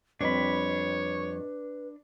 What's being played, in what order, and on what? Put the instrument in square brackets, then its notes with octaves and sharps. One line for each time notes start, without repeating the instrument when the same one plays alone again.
[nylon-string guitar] F2 G3 [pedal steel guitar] D4 B5 [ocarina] B4 [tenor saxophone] C#5